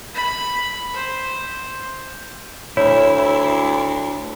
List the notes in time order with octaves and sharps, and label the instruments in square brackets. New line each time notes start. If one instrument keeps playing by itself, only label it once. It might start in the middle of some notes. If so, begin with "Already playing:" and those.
[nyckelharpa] B5
C5
[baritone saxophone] D2 [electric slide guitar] E4 [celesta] C#5